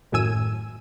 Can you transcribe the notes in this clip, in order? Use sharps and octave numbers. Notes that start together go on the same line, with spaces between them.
G#1 F#2 A2 G#5 E6 D#7